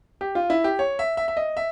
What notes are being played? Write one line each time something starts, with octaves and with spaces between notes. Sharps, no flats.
G4
F4
E4
G4
C#5
E5
E5
E5
D#5
E5